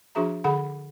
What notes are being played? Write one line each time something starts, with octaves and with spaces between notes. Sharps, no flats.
F3 D4 F#4 G#4 E5 A#5
D3 G#4 F#5 B5